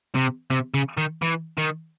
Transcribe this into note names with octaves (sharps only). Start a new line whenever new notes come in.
C3
C3
C#3
D#3
E3
D#3